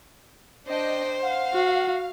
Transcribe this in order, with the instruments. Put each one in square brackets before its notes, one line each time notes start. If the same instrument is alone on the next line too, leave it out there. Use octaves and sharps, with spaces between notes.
[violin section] D4 D#5 G5 [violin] C5
[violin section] F5 [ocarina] F#5
[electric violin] F#4